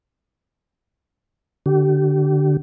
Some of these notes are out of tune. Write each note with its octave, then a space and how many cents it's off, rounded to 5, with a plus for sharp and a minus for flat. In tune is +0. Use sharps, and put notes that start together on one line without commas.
D3 +0 G4 -35